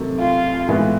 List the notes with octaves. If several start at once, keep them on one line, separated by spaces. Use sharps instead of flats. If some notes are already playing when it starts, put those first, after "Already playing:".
Already playing: C3 D#3 F#3 A3
F4
A2 E3 G#3 B3